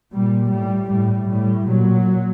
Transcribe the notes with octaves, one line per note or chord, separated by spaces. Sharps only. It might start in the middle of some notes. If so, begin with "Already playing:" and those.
A#2 G3
A2 G3
A2 G3
A2 G3
A#2 F#3